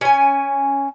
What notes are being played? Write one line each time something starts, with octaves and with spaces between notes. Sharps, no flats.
C#4 G#5